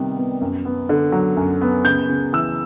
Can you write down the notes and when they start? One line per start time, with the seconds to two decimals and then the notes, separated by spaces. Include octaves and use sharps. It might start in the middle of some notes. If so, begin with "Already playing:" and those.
Already playing: C3 D#3 G3 B3
0.16 B3
0.41 F#2
0.65 B3
0.89 D3
1.12 F#3
1.37 F#2
1.61 B3
1.85 C#3 G6
2.09 C#3
2.33 E3 E6